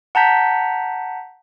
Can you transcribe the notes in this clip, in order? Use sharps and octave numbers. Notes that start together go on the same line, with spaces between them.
F#5 A5 A#5 G6 B6